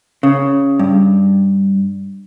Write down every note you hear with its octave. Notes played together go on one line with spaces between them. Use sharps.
C#3
G2